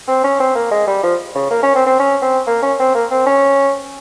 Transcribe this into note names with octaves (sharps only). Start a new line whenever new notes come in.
C4
C#4
C4
A#3
G#3
G3
F3
C#3
A#3
C#4
C4
C4
C#4
C4
A#3
C#4
C4
A#3
C4
C#4